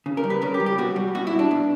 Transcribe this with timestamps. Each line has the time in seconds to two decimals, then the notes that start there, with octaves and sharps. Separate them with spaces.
0.06 C#3
0.17 A#4
0.24 G3
0.30 B4
0.42 C#3 A#4
0.54 G4
0.60 G3
0.66 G4
0.78 B2 F#4
0.96 G3
1.15 B2 F#4
1.27 E4
1.33 G3
1.39 D4
1.51 B2